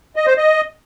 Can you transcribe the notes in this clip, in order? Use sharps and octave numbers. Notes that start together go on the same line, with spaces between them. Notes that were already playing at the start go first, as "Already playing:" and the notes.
D#5
C5
D#5